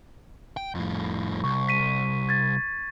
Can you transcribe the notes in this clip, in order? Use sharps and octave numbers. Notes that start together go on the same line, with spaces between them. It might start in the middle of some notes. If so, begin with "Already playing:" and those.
G5
F2 A2
C2 C#6
B6 D#7
G#6 A6